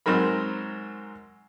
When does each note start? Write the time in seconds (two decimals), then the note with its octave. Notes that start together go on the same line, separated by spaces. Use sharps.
0.06 G#2 F#3 C4 D#4 A#4 B5